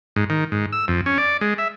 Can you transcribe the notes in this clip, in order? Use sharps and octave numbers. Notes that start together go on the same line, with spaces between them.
G#2
D#3
G#2
E6
F2
C#4
D5
G#3
E5